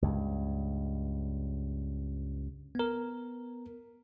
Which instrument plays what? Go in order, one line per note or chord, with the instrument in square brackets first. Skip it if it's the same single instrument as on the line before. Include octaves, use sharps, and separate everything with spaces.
[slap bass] C#2 G2
[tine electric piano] B3 A#4